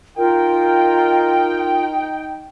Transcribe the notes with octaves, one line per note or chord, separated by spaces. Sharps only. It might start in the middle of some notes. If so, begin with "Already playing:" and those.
D#4 F4 A#4 G5